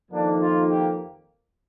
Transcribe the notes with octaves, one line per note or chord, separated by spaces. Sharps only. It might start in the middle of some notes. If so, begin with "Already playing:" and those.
F2 D#3 A#3 D4
F4
G4